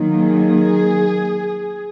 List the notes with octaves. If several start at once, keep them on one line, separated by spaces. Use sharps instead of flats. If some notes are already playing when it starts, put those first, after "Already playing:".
Already playing: D#3 F#3 A#3
G#4